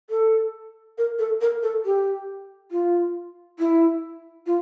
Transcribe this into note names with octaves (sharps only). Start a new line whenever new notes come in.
A4
A#4
A4
A#4
A4
G4
F4
E4
F4